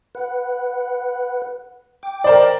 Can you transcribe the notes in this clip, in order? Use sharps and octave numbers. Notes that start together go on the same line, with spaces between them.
B4 F#5
G5 D6
A#4 C5 D5